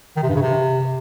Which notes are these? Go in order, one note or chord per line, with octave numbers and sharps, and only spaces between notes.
D#3
C3
G2
C#3
C3